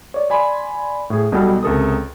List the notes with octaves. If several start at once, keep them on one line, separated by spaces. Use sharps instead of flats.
C#5 D5
D5 G#5 B5 C6
A2 G#4
B1 B2 G3 A4 G5
C#2 C3 A4 A#4 D#6